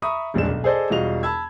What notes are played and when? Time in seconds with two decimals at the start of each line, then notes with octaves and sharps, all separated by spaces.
0.02 E5 A#5 B5 C#6 D#6
0.34 D#1 A#1 G2 G#3 D4 E7
0.48 B1
0.64 G#4 A4 C5 D5 D#5
0.90 E1 G3 F4 F#4 D#5 F7
1.23 A5 B5 E6 G#6